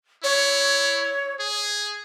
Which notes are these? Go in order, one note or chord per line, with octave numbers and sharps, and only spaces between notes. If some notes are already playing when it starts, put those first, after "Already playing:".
E4 C#5
G#4